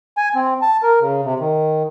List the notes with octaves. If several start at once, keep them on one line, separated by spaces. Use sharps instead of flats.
G#5
C4
A5
A#4
C#3
C3
D#3